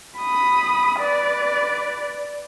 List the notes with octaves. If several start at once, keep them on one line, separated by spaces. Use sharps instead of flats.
B5 D#6
B4 D5